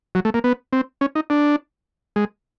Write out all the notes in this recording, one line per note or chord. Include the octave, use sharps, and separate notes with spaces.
F#3
A3
A#3
B3
C4
C#4
D#4
D4
G#3